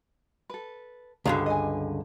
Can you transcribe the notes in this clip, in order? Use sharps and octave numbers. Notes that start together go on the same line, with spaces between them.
A4 B4
C#2 G2 D3 F#4 F5 A#5
D#5 G#5